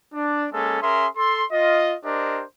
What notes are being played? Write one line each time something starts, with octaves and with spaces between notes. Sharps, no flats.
D4
G#3 A#3 C#4 A4
C#4 G#4 A#4 E5 C6
A4 C6
F4 D#5
D4 G4 A#4 C5 D#5